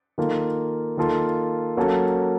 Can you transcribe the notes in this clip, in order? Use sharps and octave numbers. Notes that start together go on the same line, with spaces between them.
D#3 A#3 F4 A4
D#3 A#3 F4 A4
F#3 A#3 C#4 A4